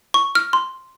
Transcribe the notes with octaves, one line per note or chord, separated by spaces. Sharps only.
C#6
F6
C6